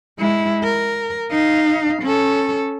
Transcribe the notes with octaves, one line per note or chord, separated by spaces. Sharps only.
G#3 E4
A#4
D#4 F5
C#4 A4